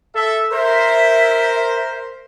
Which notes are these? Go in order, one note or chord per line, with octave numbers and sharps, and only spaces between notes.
A4 E5
A#4 C5 E5